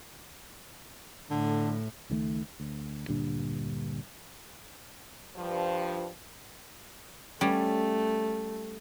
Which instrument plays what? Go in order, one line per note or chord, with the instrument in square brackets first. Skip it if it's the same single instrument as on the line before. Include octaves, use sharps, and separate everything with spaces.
[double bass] A2 [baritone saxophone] D3
[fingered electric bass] C#2 D#3 G#3 A3
D2
D2 G2 A#2 D3
[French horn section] G2 F3
[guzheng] G3 C#4 [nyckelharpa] A3